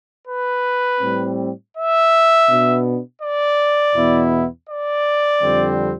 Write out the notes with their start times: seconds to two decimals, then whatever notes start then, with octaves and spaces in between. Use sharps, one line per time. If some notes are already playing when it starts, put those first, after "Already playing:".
0.26 B4
1.00 A2 G3 C4
1.74 E5
2.47 B2 B3 D4
3.21 D5
3.95 E2 B2 B3 E4
4.69 D5
5.42 F2 D3 G3 C4